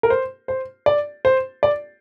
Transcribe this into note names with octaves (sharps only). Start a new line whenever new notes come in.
A#4
C5
C5
D5
C5
D5